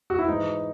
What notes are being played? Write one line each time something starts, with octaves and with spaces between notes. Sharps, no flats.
F#4
E4
G#2 E3 D#4